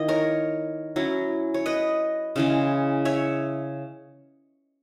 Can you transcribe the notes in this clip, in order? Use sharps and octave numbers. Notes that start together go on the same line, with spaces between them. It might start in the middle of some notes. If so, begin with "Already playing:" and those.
Already playing: D#3 A#3 E4 D#5
A#4 C#5
F#3 C#4 E4
C#5
B4 D#5
C#3 E3 G#3
C#5 E5